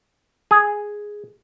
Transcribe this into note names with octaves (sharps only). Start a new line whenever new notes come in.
G#4